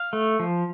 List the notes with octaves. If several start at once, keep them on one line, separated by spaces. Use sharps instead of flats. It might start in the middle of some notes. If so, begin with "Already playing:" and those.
Already playing: F5
A3
F3